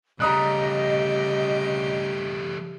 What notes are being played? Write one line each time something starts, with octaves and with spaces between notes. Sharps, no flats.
C#3 G3 A3 G4 D#5 A#5 D#6 F#6